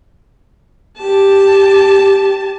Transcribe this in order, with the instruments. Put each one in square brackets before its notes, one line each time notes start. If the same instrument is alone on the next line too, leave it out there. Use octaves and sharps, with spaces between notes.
[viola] G4 A5